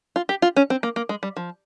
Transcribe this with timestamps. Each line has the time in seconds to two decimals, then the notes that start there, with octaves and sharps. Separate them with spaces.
0.16 F4
0.29 G4
0.42 F4
0.56 C#4
0.70 C4
0.83 A#3
0.96 A#3
1.09 G#3
1.23 G3
1.37 F3